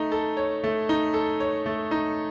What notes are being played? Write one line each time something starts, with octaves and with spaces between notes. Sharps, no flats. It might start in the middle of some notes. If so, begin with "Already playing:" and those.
Already playing: A3 D#4
A4
C#5
A3
D#4
A4
C#5
A3
D#4